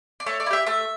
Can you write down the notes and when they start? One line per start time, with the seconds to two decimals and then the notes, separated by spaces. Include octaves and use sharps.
0.20 D5
0.26 A3 C#5
0.40 D5
0.46 E4
0.51 G4 E5
0.66 A3 E5